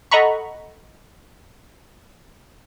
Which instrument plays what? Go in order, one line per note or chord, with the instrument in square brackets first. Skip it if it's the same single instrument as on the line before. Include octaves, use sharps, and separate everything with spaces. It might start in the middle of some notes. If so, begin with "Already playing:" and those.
[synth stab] A4 D#5 F#5 A#5 B5 C#6